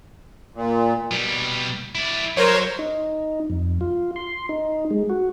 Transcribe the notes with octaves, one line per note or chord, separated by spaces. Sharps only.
A#2
B2 G3
E4 D5
F#3 A#4 C5 C#5
D#4
F2
F4
C6
D#4
G#3
F#4